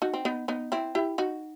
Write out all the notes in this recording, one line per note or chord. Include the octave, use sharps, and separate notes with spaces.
D#4 F#4
C4
B3 D#4
B3 D#4
C4 E4
E4 G4
D#4 F#4